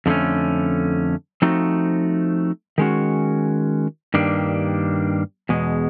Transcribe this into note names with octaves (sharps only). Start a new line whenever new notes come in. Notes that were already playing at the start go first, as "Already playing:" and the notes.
F2 D3 F#3 A3 C#4
F3 A3 C4 D#4 F#4
D#3 G#3 C#4 F#4
G2 D#3 G3 A#3 D4
E2 B2 G#3